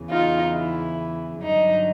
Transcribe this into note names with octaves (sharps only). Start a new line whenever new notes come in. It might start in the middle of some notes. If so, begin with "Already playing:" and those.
Already playing: E2 C#3 E3
D#4 F4
E4
G2 D3 F#3 D#4